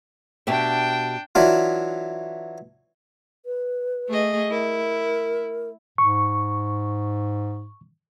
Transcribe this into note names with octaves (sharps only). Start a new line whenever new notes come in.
B2 D4 G4 E5 G5
E3 F#3 D4 F4
B4
A3 G#4 D#5
E4 A#4
G#2 C#6